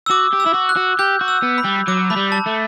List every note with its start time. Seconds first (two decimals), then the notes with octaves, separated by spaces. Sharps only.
0.06 E6
0.10 F#4 D6
0.33 G4
0.40 E6
0.46 E4
0.54 F#4
0.69 F#6
0.77 F#4
0.99 G4 G6
1.21 F#4
1.28 E6
1.43 B3
1.58 B5
1.65 G3
1.88 F#3 D6
2.10 A3 B5
2.17 G3
2.32 A5
2.46 A3